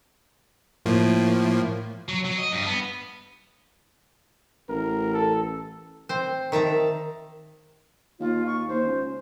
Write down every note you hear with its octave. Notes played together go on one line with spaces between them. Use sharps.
A2 F3 A#3
F#3
F#3
D#5
G2
B3
A1 A#4
A4
C4 C5
D#3 E5 A5 A#5
D#2 F4
C#6
D#2 C5
C#2